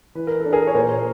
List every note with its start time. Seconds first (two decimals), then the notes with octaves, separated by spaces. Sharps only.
0.15 E3 B4
0.27 A#4
0.40 A4
0.46 D4
0.53 G#4 A#4
0.67 C#5
0.75 A#2 A#4 C5